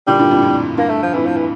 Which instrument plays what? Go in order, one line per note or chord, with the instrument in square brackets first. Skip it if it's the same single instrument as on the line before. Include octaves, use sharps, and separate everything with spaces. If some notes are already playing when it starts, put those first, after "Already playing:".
[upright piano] A#2 D3 [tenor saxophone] G3
[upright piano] G2 A#2
F2 A2
F2
[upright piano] G2 [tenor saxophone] A#3
[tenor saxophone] A3
F3
[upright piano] F2 A2 [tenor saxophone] E3
[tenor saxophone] F3
E3